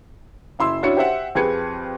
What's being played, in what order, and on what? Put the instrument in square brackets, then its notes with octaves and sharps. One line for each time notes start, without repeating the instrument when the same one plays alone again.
[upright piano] F#1 E4 C6 E6
C#4 D4 E4 F#4 C#5 C#7
G4 C5 E5 F#5
F2 G4 G#4 B4 G#6 C#7